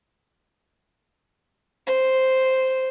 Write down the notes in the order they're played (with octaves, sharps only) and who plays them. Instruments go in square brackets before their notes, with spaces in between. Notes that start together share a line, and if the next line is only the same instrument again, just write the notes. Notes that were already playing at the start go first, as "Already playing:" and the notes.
[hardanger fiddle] C5